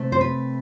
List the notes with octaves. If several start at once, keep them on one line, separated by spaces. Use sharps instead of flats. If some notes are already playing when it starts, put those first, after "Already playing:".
Already playing: C3 A3 C4
C5
B4